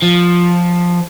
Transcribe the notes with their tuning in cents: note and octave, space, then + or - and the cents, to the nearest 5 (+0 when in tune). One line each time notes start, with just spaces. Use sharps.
F3 +5